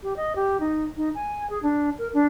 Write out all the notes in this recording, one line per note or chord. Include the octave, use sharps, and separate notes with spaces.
G4
D#5
G4
D#4
D#4
G#5
G#4
D4
A#4
D4